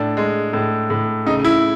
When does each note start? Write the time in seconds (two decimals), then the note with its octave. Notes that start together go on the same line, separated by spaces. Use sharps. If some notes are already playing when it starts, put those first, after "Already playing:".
Already playing: A2 D4
0.17 G#3
0.53 A2
0.90 A2
1.26 C#3 D#4
1.45 E4